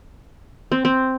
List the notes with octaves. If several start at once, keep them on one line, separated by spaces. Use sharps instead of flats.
C4
C4